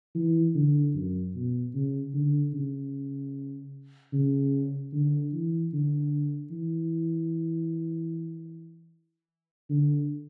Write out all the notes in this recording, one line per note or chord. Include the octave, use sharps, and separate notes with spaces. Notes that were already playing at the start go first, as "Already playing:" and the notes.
E3
D3
F#2
B2
C#3
D3
C#3
C#3
D3
E3
D3
E3
D3